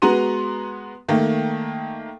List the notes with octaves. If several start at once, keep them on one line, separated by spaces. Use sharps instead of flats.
G#3 B3 F#4 A#5 C6 D#7
D#3 A3 A#3